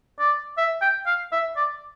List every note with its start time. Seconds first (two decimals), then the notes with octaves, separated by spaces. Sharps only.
0.20 D5
0.58 E5
0.82 G5
1.07 F5
1.32 E5
1.57 D5